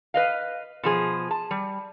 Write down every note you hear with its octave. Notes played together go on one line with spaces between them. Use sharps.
B4 D#5 F5
B2 F3 G#4
A5
G3